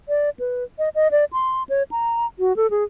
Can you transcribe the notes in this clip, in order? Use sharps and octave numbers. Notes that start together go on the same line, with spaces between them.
D5
B4
D#5
D#5
D5
C6
C#5
A#5
F#4
A4
G#4